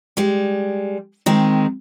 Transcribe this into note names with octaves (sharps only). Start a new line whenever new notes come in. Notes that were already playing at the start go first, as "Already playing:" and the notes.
G3 G#3
D#3 G#3 C4